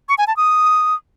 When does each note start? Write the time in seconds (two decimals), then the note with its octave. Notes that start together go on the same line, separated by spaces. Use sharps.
0.09 C#6
0.18 G#5
0.27 A5
0.37 D#6